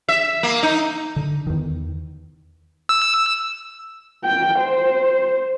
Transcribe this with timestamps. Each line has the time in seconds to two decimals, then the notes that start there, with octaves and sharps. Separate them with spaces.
0.09 E5
0.43 A#3
0.63 D#4
1.16 D3
1.47 E2 D#3
2.89 E6
4.24 G5
4.60 C5